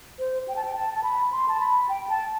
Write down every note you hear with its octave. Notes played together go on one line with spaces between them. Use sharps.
C5
G5
A5
G5
A5
A5
B5
C6
A5
B5
G5
A5